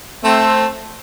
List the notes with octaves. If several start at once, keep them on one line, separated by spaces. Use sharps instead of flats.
A3 C4